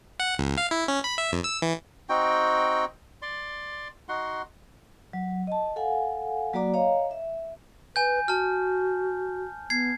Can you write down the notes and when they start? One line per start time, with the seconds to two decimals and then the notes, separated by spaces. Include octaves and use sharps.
0.20 F#5
0.39 C#2
0.57 F5
0.71 E4
0.88 C#4
1.04 B5
1.18 E5
1.32 F2
1.44 E6
1.62 E3
2.09 C4 D#4 F#4 G5
3.22 D5 C6
4.09 D#4 F#4 F#5 C6
5.13 F#3
5.47 D#5 A5
5.76 A4 F5 F#5 G#5
6.53 F#3 A#3 F#4 D5 A#5 D6
6.74 C#5 D#5 F5 A#5
7.11 E5
7.96 B4 G#5 G6
8.28 F#4 A5 F6
9.70 B3 G#6 C7